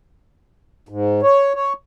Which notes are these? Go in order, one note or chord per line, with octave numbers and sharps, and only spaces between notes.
G#2
C#5
C#5